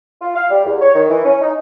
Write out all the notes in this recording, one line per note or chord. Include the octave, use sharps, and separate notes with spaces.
F4
F5
G3
E2
C#5
D#3
E3
C#4
D#4